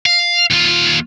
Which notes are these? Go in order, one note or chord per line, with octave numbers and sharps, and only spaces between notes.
F5
D#2 F4